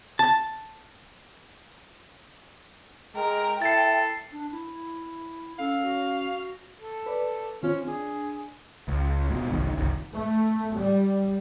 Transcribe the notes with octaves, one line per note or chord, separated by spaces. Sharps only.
A5
G#3 A#4 G5
E4 A4 A6 C7
D4
E4
C#4 A4 F5
F#4
A4
B4 D5
D#3 C4 C#4 F4
D4 G#4
C#2
D#1 G#2 B2
G1 C2 D#3
F#1 C2 D#3
A3
G3